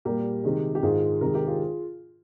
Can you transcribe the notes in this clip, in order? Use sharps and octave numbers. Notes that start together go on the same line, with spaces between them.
A#2 G3 A#3 G4 A#4
C3 D#3 G#3
G4
G#2 D#3 G#3 F4 G#4
C3 D#3 G#3 G4 A#4
G4 A#4
F4 G#4